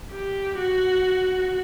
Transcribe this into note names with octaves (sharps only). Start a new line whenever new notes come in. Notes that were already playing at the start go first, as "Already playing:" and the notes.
G4
F#4